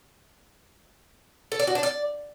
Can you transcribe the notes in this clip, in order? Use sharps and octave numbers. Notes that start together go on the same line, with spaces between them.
A4
D5
F#4
D4
D5